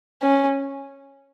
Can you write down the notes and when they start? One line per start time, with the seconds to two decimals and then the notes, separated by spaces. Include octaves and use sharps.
0.22 C#4